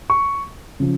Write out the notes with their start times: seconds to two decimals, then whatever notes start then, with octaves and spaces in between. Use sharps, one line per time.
0.10 C#6
0.80 C#3 F3